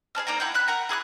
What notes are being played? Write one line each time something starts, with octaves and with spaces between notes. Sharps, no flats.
G#4 D5 A5 F6
A#3 D#4 D5 A#5
E4 F#5 G5
E5 B5 F#6
A#4 F#5 A#5
E4 G#4 D#6 F#6